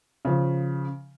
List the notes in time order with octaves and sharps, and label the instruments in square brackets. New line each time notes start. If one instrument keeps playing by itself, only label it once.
[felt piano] C#3 F3